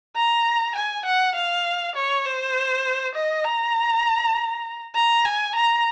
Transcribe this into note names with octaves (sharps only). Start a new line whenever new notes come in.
A#5
G#5
F#5
F5
C#5
C5
D#5
A#5
A#5
G#5
A#5